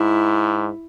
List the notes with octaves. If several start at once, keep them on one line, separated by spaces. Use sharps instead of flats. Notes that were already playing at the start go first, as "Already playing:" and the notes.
Already playing: G#2 E4